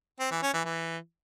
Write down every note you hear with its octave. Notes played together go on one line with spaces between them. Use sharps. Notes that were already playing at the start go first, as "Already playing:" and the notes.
C4
E3
C#4
E3
E3